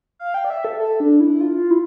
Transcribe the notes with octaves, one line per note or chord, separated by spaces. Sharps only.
F5
G5
D5
E5
A4
A4
D4
E4
F4
E4